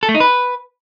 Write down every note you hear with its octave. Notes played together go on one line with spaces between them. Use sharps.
A4
A3
D#4
B4